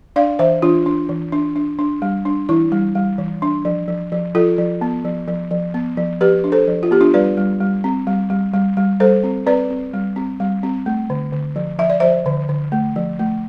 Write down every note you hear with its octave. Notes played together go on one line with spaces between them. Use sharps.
D4 D5 F5
E3 C5 E5
E3 D4 F4
D4
E3
D4
D4
D4
G3
D4
E3 E4
G3
G3
E3
D4
F3
F3
F3
F3 F4 A4
F3
B3
F3
F3
F3
B3
F3
F3 G4 B4
D4
A4 C5
F3
F4
B3 G4
D4 F4
G3 B4 D5
G3
G3
C4
G3
G3
G3
G3
G3 A4 C5
C4
C4 B4 D5
C4
G3
C4
G3
C4
A3
D3
D3
F3
F3 E5
D5
F3 C5 E5
D3
D3
A3
F3
A3